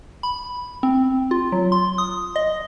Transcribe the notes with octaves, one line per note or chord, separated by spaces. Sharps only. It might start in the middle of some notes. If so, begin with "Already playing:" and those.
B5
C4
F4
F#3
C6
D#6
D#5